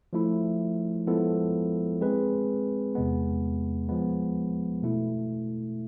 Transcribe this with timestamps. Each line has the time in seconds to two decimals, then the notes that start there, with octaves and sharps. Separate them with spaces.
0.13 F3 A3 E4
1.07 F3 G#3 B3 E4 A4
2.01 G#3 C4 G#4 B4
2.95 E2 C3 G#3 B3
3.89 F3 G#3 B3
4.83 B2 A3 E4